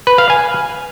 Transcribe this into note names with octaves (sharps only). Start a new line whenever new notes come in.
B4
F5
G#5